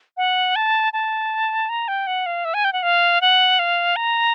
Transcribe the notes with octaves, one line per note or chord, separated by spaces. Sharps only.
F#5
A5
A5
A#5
G5
F#5
F5
E5
G#5
G5
F#5
F5
F#5
F5
A#5